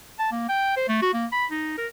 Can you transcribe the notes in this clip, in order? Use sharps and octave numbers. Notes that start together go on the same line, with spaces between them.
A5
A#3
G5
C5
A3
F#4
A#3
B5
D#4
A#4